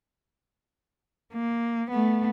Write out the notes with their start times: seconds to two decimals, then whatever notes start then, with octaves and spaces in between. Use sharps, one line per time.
1.33 A#3
1.90 A3 B3